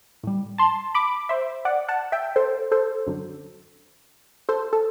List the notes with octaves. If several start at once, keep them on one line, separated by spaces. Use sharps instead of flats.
A2 G3
A5 C6
B5 D6
C5 E5
D5 F#5
F#5 A5
E5 G5
A4 C5
A4 C5
F#2 D3 F#3
A4 C5
A4